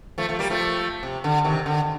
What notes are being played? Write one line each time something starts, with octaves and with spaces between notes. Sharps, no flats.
F3 A3
F3 A3
G3 A#3
F3 A3
C3
D3
C3 D#3
D3